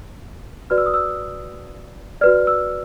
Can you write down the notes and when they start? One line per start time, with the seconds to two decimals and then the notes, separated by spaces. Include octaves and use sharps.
0.70 F#4 B4 D5 F6
0.78 E6
0.86 D#6
0.94 E6
2.21 F#4 B4 D5 F6
2.47 E6